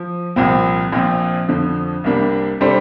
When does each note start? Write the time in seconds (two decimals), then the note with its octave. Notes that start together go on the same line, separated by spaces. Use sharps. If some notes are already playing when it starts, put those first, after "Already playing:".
Already playing: F3
0.36 C2 A#2 F3 C4
0.92 A#1 A#2 F3 C4
1.48 F2 D3 F3
2.04 C2 C3 G3 A#3 D4
2.61 C3 G3 D4 A4 C5